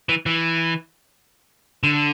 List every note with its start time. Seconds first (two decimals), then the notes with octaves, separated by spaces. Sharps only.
0.09 E3
0.26 E3
1.83 D3